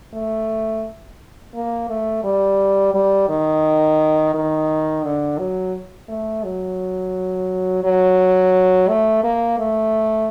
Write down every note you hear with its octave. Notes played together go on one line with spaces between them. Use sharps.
A3
A#3
A3
G3
G3
D#3
D#3
D3
F#3
A3
F#3
F#3
A3
A#3
A3